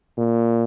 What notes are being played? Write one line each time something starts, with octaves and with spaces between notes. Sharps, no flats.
A#2